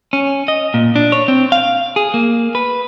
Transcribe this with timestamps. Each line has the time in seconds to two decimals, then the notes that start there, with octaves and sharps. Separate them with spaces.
0.13 C#4
0.48 D#5
0.74 A#2
0.96 D4
1.12 C#5
1.28 C4
1.52 F5
1.96 G#4
2.14 A#3
2.55 B4